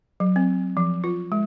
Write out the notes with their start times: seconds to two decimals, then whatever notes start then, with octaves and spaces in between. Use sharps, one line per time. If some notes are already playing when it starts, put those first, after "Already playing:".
0.20 F#3
0.36 C4
0.77 F3
1.04 F4
1.32 G#3